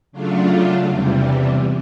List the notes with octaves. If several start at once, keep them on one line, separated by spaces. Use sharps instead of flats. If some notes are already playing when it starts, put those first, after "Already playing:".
C#3 F#3 A3 D4 F4
E2 C3 E3 G3